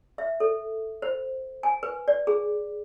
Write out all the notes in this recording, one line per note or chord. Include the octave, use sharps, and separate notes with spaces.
E5
A4
C5
G#5
B4
D5
G#4